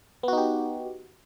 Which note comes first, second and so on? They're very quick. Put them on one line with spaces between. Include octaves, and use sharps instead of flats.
B3 F#4 D#4 G4